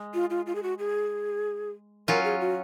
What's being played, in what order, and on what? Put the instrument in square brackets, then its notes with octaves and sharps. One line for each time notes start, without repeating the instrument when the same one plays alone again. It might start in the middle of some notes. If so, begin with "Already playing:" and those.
Already playing: [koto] G#3
[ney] F4
F4
F4
G#4
F#4
G#4
[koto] F#3 C#4 F4 [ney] A#4
[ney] G#4
F#4